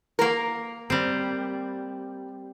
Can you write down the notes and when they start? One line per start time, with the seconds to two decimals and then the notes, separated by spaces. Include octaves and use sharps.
0.19 A#3 A#4
0.90 G3 C4